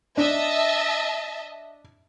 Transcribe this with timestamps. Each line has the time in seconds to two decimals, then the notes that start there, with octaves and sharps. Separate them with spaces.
0.17 D4 D#5 E5 A5